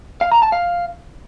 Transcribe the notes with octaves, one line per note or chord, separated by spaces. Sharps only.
F5
A#5
A5
F5